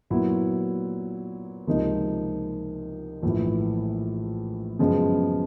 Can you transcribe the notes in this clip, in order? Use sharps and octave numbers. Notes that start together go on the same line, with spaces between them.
A#2 F#3 B3 E4
C#2 C3 F3 A#3 D#4
A#1 A2 E3
F#2 C#3 F3 G#3 B3